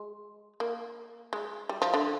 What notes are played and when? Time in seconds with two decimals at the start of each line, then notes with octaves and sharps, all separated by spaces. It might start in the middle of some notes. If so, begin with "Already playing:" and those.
Already playing: G#3
0.60 A#3
1.33 G#3
1.69 G3
1.82 F3
1.94 D3